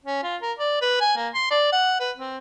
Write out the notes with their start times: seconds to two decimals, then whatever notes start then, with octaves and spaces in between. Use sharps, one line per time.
0.05 C#4
0.23 F4
0.42 A#4
0.59 D5
0.82 B4
1.01 G#5
1.17 A#3
1.34 C6
1.51 D5
1.72 F#5
2.00 B4
2.17 C4